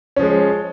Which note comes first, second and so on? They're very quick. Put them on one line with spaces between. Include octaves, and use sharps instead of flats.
C#4 F3 G#3